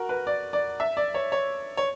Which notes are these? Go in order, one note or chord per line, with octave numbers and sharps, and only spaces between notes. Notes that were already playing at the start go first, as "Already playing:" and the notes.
Already playing: F#4 A#4
B4
D5
D5
E5
D5
C#5
C#5
C#5